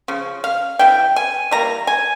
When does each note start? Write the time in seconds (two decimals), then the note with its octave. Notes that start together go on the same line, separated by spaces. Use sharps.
0.08 C#3 F3
0.44 F5
0.79 C3 E3 G5
1.16 G#5
1.51 E3 G3 A#3 A#5
1.87 G#5